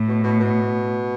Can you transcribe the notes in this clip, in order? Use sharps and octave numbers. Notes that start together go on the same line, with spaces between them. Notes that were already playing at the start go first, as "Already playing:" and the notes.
Already playing: A2
B2
B2
B2